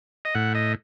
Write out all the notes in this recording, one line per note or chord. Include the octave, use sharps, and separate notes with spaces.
D#5
A2 F#5
D#5